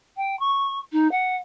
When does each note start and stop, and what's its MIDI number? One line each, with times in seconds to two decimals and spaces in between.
0.17 0.38 79
0.40 0.79 85
0.92 1.10 63
1.11 1.36 78